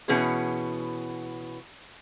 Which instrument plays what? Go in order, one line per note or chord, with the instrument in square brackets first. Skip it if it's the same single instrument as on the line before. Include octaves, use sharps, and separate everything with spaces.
[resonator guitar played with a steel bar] B2 E3 B3 C#4 G#4